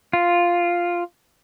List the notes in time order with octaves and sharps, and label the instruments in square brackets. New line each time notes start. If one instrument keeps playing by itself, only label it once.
[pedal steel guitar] F4